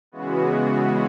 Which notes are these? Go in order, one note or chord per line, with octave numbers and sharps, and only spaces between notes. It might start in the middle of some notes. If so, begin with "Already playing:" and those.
C#3 E3 G#3 B3 F#4